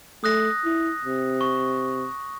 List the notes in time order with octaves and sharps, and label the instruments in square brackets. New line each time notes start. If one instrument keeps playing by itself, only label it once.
[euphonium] A3 [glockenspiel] D#6 F#6 A#6
[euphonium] E4
C3
[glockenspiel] C#6